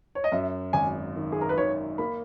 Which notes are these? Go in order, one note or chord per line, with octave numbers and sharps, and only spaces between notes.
C#5
D#5
F#2 E5
G#1 G#5
D#3
G#4
A#4
B4
D#3 C#5
A#3 B5